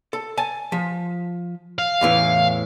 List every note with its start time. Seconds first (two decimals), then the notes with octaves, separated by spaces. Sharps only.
0.13 A4
0.37 G#5 A5
0.72 F3
1.78 F5
2.01 E2 A2 E3